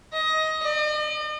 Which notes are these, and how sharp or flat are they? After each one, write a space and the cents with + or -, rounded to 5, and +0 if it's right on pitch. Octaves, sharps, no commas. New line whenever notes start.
D#5 +15
D#5 -45